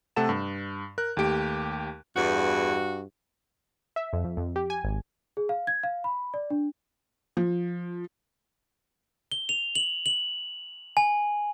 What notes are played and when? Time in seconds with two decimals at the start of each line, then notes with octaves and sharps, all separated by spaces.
0.16 C3 A3 A4 F#5 A5 E7
0.29 G2
0.98 A#4 F#6
1.17 D#2 A3 G4 D7
2.16 E2 G2 F#4
3.96 E5
4.13 F2
4.24 F2
4.37 F2
4.56 G4
4.70 G#5
4.84 G#1
5.37 G#4
5.49 F5
5.67 G#6
5.83 F5
6.04 B5
6.34 D5
6.50 D4
7.37 F3
9.32 G7
9.49 F7
9.75 F#7
10.06 F#7
10.97 G#5